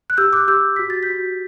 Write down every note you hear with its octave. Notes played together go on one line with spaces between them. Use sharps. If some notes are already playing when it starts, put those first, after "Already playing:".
F#6
G4 E6 G6
D6 F#6
G4 E6 G6
F#4 B6
A6
G6 B6
F#4